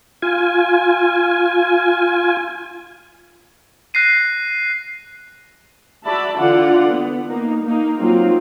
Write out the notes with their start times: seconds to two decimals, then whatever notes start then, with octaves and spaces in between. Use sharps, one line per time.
0.22 F4 G#5
3.94 F#6 A#6 C7 D#7
6.05 F#4 D5 E5 A5 B5
6.37 D3 E3 F4 D5 F#5
6.92 B3
7.28 A#3 D#4
7.63 A#3 D#4
7.99 F#3 A#3 C4 D#4 F4